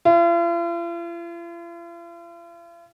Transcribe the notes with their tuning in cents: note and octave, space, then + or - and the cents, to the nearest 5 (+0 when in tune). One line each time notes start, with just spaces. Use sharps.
F4 -45